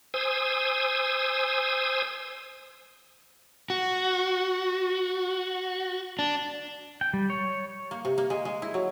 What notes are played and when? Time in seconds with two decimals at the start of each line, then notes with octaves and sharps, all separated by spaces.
0.14 C5 G#5 D#6 E6
3.70 F#4
6.19 D4
7.01 G5
7.14 G3
7.30 C#5
7.91 A#3
8.05 C3
8.18 A#3
8.30 G#3
8.45 G#3
8.62 E4
8.74 F#3